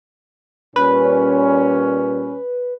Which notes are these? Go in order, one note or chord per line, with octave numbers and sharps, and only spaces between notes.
A#2 G3 C#4 B4